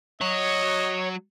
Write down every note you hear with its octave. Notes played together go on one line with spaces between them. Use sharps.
F#3 C#5 D#5